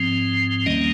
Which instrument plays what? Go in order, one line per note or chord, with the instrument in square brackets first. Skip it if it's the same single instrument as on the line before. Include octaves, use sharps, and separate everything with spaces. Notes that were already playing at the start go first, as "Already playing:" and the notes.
Already playing: [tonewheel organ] G#2 F3 C4
D#2 D#3 G3 A#3 C#4 D#5